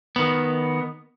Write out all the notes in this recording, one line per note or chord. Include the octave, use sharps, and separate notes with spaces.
D#3 B3